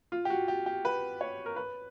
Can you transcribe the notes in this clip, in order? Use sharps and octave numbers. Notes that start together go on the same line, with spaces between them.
F4
G4
F#4
G4
G4
B4
C#5
A#4
B4